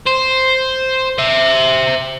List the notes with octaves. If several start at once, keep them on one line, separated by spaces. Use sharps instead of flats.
C5
C5 E5